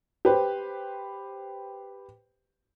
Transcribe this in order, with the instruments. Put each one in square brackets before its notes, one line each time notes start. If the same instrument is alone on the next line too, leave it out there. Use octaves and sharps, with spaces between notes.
[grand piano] G4 B4 C5